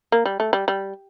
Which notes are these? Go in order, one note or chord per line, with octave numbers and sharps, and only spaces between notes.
A#3
G3
A3
G3
G3